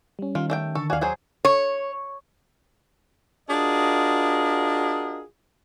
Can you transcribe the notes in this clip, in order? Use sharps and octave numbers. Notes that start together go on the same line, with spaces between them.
G3 C#4
D#3 F4
A3 D5 G5
D3 A4 C#6
D#2 F#4 D5 F5 G#5
F#3 G#4 C5
C#5
D4 F4 F#4 G#4 A#4 D#5